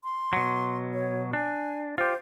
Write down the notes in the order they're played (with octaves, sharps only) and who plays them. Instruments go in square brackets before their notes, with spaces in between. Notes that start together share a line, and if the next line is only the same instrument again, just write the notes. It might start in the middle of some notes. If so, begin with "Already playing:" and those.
[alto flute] C6
[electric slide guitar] B2 F#3
[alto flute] C#5
[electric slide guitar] D4 [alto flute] G#5
[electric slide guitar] F4 G4 [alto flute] C5